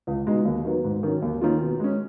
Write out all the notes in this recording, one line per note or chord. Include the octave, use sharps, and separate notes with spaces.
C#2
B2 G#3 D#4
D#2
D#3 F#3 B3
G#2
D#3 F#3 C#4
D#2
D#3 A#3 C#4 F4
B2
G#3 C#4